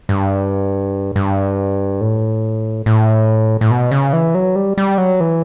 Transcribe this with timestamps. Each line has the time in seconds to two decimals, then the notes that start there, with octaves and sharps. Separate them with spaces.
0.09 G2
1.16 G2
2.01 A2
2.86 A2
3.61 A2
3.71 B2
3.91 C#3
4.13 E3
4.34 F#3
4.56 G3
4.78 G3
4.98 F#3
5.20 E3